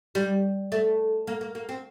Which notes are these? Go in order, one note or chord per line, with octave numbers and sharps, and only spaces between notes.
G3
A3
A#3
A#3
A#3
C4